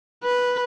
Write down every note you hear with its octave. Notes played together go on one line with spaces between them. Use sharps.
B4